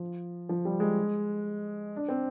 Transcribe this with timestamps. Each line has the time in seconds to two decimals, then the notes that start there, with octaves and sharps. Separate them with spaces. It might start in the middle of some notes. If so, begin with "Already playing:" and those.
Already playing: F3
0.49 F3
0.65 G3
0.80 G#3
1.96 D4
2.09 C4